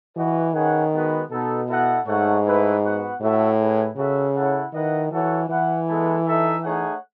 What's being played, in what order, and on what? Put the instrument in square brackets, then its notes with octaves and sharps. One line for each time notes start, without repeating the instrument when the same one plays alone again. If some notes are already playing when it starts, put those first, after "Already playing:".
[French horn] E3 [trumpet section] F#4 B4 D#5 F#5
[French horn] D#3 [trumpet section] C#4 G#4 B4 F#5
[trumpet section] G#3 B3 F#4 B4
[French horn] B2 [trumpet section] B3 D#4 A4
[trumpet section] E4 A4 D#5 F#5
[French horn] G#2 [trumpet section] A3 D#4 A4 C#5 F#5
[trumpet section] A3 E4 B4
B3 F#4 B4 F#5
[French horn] A2 [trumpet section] F#4 A4 E5
[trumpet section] E4 G#4 B4
[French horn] C#3 [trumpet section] C#4 F#4 A4 E5
[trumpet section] E4 A4 C#5 F#5
[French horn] D#3 [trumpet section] E4 B4 D#5 F#5
[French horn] E3 [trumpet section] F#4 A4 C#5 F#5
[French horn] E3 [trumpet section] E4 B4 F#5
[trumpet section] G#3 B3 E4 A4
D#4 A4 E5
A3 D#4 G#4 C#5 F#5